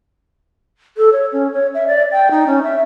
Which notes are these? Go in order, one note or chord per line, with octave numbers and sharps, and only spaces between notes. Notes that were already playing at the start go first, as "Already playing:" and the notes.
A4
C#5
C#4
C#5
E5
D5
G5
D#4
C#4
E5